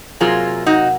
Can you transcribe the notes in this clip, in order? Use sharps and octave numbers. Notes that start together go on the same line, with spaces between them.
C3 F#3 A#3 F4 G#4
D#4 F#4